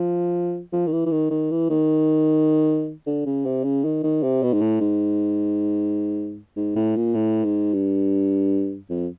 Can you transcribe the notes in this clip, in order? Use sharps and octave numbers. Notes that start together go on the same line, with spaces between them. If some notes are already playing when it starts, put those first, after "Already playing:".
Already playing: F3
F3
D#3
E3
E3
D#3
D#3
E3
D#3
D3
C#3
C3
C#3
D#3
D#3
C3
B2
G#2
A2
G#2
G#2
A2
A#2
A2
G#2
G2
F2